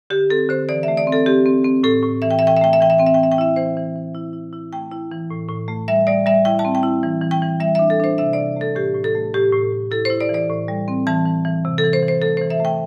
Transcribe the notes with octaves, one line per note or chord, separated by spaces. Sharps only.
D3 G4
C4 A4
D3 C5
E3 D5
A3 E5
D5
C4
A4
C4 G4
C4
C4
A2 A4
A2
E3 E5
G5
E5
E3 G5
E5
A3 G5
E5
E3 G5
E5
C4 G5
E5
G5
E3
E5
G5
E4 E5
E3 C5
E3
E3
E4
E4
E4
A3 G5
E4
E3
A2
A2
A3
G3 E5
G3 D5
G3 E5
E4 G5
A5
C4
G5
E4
E3
E3
G5
E3
G3 E5
D4 E5
A4
D4 C5
C3 E5
C3 D5
A3 A4
A2 G4
A2
A4
A3
A2 G4
A2
A2
E4 A4
E4 C5
D5
E3
D5
A2
G3
C4
E3 A5
E3
E3
C3
A4
E3
C5
E3
C5
A3 A4
E3 C5
E5
A3 G5